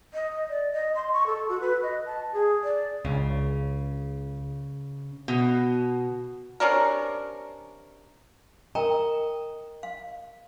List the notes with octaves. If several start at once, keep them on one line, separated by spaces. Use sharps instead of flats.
D#5
D5
D#5
C6
C#6
A4
F#4
B4
D#5
A5
G#4
D5
C#2 C#3
B2
C3 C#4 D4 A#4
A#4 D#5 G5 A#5
F5